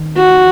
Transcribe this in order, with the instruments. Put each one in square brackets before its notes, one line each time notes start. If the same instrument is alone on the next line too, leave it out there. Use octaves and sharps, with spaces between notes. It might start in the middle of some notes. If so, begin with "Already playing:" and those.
Already playing: [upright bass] D#3
[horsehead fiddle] F#4